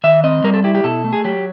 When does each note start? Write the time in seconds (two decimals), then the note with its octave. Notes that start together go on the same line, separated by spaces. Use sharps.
0.04 D#3 E5
0.24 C4 D#5
0.44 G3 A#4
0.54 A4
0.64 E4 G4
0.75 G4
0.84 B2 A4
1.04 A3
1.13 G#4
1.25 F#3 G4